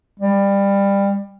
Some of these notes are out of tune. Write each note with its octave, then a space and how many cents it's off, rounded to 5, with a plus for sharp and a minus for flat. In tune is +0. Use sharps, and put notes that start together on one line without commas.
G3 +20